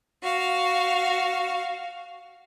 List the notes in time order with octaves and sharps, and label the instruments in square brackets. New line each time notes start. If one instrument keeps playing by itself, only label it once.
[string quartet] F#4 F5